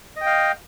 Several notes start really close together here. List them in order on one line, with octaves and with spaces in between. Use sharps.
D#5 G5 F5